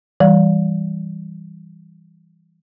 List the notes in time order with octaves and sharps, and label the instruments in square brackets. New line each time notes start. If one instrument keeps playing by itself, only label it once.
[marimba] E3 G3